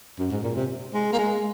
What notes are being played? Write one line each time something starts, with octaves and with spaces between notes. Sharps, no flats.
F#2
G#2
A#2
C3
G#3
A#3
G#3